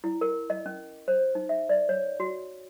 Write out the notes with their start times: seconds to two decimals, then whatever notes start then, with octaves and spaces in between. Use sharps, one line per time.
0.04 E4
0.21 A#4
0.50 D#5
0.66 C#4
1.08 C5
1.35 D#4
1.49 E5
1.69 D5
1.89 C#5
2.20 F#4